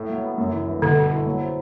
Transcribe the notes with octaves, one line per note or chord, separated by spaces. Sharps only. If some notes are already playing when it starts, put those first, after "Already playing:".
Already playing: A2
F#3
B3
F#2
E3
G1
B2 D3
A3
E4
F#3
C4